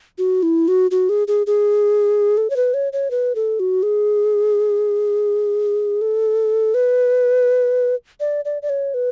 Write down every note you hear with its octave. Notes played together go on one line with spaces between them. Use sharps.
F#4
E4
F#4
F#4
G#4
G#4
G#4
A4
C#5
B4
C#5
C#5
B4
A4
F#4
G#4
A4
B4
D5
D5
D5
C#5
B4